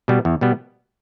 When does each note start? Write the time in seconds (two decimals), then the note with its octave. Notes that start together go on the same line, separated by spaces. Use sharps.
0.08 B2 G3 B3
0.25 E2
0.41 B2 G3 B3